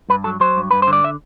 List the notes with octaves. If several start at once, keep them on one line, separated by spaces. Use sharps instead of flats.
G2 B4
F#3 A4
F#3 C5
G2
G2 B4
C5
D3
D5
E5